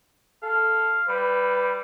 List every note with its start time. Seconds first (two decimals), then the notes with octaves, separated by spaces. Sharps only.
0.43 A4 F5
1.08 G3 B4